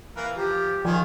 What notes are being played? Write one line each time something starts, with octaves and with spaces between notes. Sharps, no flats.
E3 A#3 B4 F5
F3 G4
D#3 F3 F4 G#5 C#6